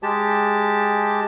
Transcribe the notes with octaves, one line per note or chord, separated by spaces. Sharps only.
G#3 G4 A5